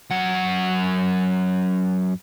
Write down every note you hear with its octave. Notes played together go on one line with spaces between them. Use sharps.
F#2 F#5